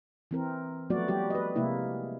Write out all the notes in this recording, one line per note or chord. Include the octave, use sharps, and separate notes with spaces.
E3 C4 A#4
F3 F#3 A3 B3 F#4 D5
G3 F#4 G4
B4 D#5
C3 G#3 A#3 E4